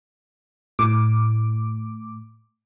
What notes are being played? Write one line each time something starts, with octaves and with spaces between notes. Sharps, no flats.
A2 D6